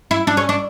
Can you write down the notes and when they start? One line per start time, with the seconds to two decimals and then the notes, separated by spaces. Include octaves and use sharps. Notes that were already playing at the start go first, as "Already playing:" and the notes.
0.11 E4
0.27 D4
0.37 C#4
0.49 D4